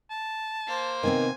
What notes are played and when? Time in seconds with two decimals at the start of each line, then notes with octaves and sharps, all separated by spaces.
0.11 A5
0.67 A#3 C5
1.03 C3 D#3 B3 C4 G#5